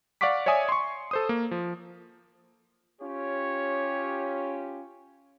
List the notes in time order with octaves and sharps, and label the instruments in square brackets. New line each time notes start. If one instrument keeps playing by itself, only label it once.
[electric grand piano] D5 F5 F#5 C#6 D6 B6
C#5 D5 E5 G#5 D#6
C6 C#6
A4 C5 D#6
A#3
F3
[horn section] C#4 F4 G4 [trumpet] C#5